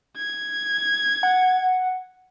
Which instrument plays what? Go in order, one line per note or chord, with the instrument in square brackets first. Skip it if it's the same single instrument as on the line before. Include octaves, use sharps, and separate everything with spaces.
[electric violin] G#6
[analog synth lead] F#5